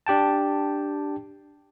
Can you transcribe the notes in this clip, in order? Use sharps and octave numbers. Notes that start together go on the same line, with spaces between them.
D4 G4 G5 A5